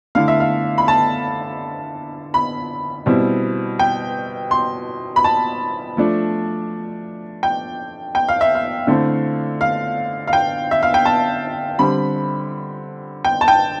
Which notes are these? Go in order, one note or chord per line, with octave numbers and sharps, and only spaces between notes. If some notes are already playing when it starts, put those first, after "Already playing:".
D3 A3 E4 F5
E5
F5
B5
A5
B5
B2 G3 C4 E4
G5
C6
B5
A5
F3 A3 D4
G5
G5
F5
E5
F5
D3 A3 C4 E4
F5
F5
G5
E5
F5
G5
A5
D3 G3 C4 B5
G5
A5
G5